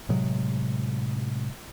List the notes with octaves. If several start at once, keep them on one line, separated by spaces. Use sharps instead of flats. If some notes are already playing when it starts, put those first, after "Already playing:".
A2 C3 F#3 G#3